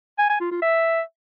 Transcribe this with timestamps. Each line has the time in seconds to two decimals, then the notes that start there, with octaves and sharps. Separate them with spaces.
0.18 G#5
0.29 G#5
0.40 F4
0.51 F4
0.62 E5